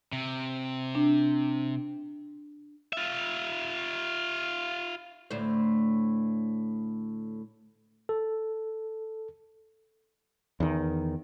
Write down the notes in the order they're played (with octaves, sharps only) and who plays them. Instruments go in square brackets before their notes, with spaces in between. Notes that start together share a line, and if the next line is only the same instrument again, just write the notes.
[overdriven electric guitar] C3
[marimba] D4
[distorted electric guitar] F4 E5
[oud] D2 A2 C5
[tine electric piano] A4
[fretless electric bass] E2 D#3